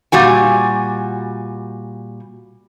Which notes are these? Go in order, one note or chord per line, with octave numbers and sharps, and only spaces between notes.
A#2 G3 F#4 G#5